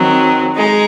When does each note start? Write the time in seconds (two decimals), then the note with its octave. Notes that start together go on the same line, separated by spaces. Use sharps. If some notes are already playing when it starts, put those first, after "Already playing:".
Already playing: D#3 F#3 C4
0.55 G#3 D#4